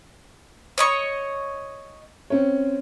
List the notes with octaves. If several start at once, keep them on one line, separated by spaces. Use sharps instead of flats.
C#5 D#5 C#6
C4 C#4 C#5